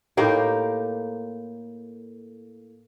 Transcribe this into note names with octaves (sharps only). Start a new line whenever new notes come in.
A2 A#3 D#4 G4